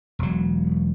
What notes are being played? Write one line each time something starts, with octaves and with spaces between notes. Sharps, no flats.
E1 F#3